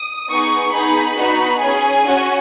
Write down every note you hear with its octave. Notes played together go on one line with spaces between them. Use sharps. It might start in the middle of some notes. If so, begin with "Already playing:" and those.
Already playing: D#6
B3 D#4 G#4 C#6
B3 D#4 G#4 B5
B3 D#4 F#4
C#4 G#4 G#5
C#4 F#4